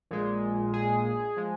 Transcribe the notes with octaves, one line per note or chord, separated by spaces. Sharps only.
A#1 A#2 G#3
G#4
F3 G#3